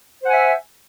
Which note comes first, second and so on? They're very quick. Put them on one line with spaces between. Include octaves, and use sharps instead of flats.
C5 F#5 G#5 E5